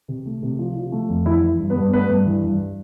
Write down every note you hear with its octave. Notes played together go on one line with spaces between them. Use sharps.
C3
A3
C3
F3
F3
A3
F2
E3 E4
E3
G2
B3 B4
G2
A3 B3 B4
G2
E3
G2